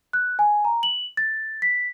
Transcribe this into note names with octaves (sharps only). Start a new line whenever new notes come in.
F#6
G#5
A#5
F#7
A6
B6